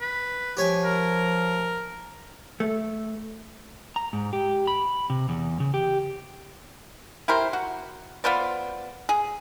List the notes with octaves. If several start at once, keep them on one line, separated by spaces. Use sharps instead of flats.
B4
F3 G4 C#5 G#5
A#4
A3
A#5
G#2
G4
B5
C3
E2
C#3
G4
E4 G4 A#4 C5
F#4
B3 F4 C5 D5
G#4